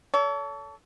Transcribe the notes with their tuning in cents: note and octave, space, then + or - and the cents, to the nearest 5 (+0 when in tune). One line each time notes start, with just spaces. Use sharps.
A4 +0 C#5 +40